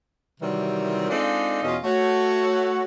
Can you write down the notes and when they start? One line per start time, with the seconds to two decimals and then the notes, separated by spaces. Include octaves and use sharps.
0.40 C3 D#3 E3 F#3 G3 C4
1.10 G#3 C4 D4 D#4 F4 A4
1.63 E2 B2 C#4 F4 D#5
1.84 A3 F#4 C#5